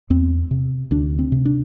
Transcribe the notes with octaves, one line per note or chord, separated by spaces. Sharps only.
E2 C4
C3
D2 D4
C4
C3
D4